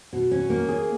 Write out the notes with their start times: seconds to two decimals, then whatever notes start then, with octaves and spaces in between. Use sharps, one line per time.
0.13 B2
0.31 C#4
0.50 A#3
0.68 G#4